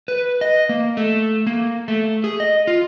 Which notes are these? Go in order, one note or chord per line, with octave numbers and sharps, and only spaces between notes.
B4
D#5
A#3
A3
A#3
A3
G#4
D#5
F4